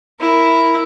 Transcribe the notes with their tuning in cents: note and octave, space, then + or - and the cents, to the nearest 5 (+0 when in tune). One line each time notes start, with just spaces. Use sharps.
E4 +0 A#4 +0